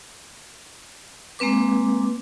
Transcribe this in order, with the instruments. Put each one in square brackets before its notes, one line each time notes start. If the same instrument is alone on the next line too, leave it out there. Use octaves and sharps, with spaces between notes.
[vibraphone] G#3 A#3 C4 B4 D6